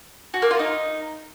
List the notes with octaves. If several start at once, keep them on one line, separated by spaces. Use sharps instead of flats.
F#4
A#3
F4
D#4